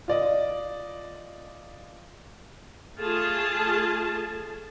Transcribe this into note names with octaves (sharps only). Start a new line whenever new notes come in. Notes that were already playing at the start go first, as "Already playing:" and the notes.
F4 D5 D#5
A3 F4 G#4 A5